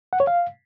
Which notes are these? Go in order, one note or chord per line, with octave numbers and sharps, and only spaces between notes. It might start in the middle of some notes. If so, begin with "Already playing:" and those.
F#5
C#5
F5